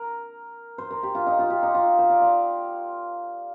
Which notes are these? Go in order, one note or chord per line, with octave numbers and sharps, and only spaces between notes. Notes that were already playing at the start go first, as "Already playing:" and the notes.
Already playing: A#4
C5
A#4
G4
F4
D#4
F4
G4
D#4
F4
C5
D5
F5